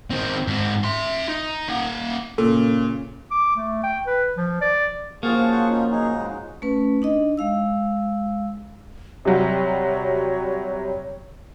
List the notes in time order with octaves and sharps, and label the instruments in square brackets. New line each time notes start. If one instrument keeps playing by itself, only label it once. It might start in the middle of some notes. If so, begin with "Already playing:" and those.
[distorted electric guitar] D#3 C4
G#2 C4
E5 C6
D#4
A#3 F#5
[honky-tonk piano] A#2 [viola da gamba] C#3 [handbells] A4
[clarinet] D6
A3
G5
B4
F3
D5
[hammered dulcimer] C#3 F3 F#4 [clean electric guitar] A#3 [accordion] G#4 A5 [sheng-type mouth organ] F5 C#6
[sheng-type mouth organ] C5 F#5 C#6
C#4 D#4 F4
[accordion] F#3 G#4 [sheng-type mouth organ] D#4
[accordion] G#2 C#3
[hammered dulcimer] G#3
[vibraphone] A3 C#4 B4
D4 D#4 D#5
G#3 F5 E6
[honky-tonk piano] C3 F#3 G3 [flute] C#5